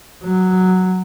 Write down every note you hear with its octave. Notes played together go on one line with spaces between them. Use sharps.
F#3